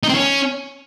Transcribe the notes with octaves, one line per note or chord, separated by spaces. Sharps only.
D#4
C4
C#4